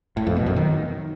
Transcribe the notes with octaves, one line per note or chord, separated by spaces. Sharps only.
A2
F2
B2
F#2
D#3